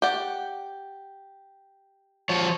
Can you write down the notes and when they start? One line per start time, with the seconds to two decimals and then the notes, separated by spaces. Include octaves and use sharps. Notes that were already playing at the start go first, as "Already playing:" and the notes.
0.02 G4 D5 F#5
2.29 F3 C#5